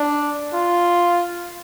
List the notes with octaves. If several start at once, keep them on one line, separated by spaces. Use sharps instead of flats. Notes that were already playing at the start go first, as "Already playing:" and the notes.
Already playing: D4
F4